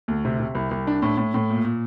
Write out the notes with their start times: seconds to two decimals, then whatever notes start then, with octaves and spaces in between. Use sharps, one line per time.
0.08 D2
0.25 C3
0.40 C3
0.55 C2
0.71 C2
0.87 D4
1.02 A2
1.17 A2
1.34 A2
1.50 A#2
1.64 A#2